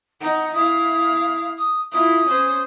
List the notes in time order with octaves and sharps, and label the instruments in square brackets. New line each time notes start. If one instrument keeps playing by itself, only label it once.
[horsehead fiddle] D#4 [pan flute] F#5
[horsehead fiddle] E4 F5 [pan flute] D#6
[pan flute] D#6
[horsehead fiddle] E4 F4 [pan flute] D#6
[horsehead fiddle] C#4 C5